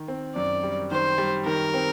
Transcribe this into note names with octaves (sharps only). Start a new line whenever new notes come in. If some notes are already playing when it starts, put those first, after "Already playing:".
Already playing: D#3
C4
F#2 D5
G3
D#3 C5
G3
D#3 A#4
C4